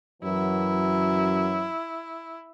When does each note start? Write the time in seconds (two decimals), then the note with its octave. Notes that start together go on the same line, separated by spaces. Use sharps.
0.23 F#2 E3 F#3 E4